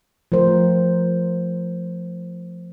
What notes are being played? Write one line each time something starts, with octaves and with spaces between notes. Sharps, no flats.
F3 A3 A#4 C5